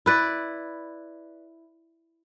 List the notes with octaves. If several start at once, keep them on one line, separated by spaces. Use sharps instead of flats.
E4 B4 D5